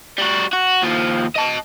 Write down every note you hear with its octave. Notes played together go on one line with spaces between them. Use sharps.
G3 F#4
F#4
D#2 F3
D#5 A5